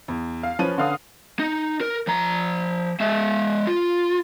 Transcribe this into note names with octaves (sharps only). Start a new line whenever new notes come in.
E2
F5
F3 C#4 B4 D#7
D3 F5 D#6
D#4
A#4
F3 A#5
G#3 E5
F4